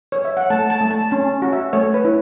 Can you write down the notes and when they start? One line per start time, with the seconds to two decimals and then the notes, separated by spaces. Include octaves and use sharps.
0.12 C#5
0.25 E5
0.37 F#5
0.50 A3 A5
0.70 A5
0.81 A3
0.91 A5
1.11 C#4 A5
1.42 F#4
1.53 E5
1.73 A3 C#5
1.94 B4
2.05 E4